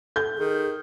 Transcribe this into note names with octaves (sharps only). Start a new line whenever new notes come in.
A4 G6
D#3 G#4